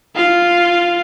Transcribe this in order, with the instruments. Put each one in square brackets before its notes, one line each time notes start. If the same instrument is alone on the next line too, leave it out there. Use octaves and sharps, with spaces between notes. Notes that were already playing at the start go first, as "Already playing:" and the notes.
[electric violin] F4 F5